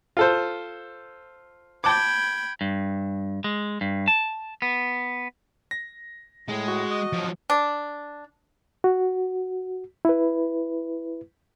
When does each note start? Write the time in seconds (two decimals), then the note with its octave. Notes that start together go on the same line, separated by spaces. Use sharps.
0.17 F4 A4 C5
1.84 G5 A5 B5 D6 G#6
2.61 G2
3.44 G#3
3.81 G2
4.08 A5
4.62 B3
5.71 A#6
6.48 A2 G#3
6.68 F#4
6.90 D#5
7.13 F3 F#3
7.50 D4
8.84 F#4
10.05 E4 B4